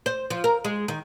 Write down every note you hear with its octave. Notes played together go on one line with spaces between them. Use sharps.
C5
F3
A#4
G#3
D#3